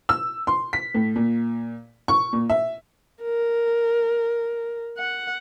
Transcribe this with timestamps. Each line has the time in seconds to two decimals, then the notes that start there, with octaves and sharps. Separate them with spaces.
0.09 E6
0.47 C6
0.73 B6
0.94 A2
1.16 A#2
2.08 C#6
2.33 A#2
2.50 E5
3.22 A#4
4.99 F#5